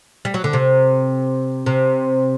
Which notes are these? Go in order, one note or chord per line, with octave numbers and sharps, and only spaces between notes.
G3
F#3
D3
C3
C3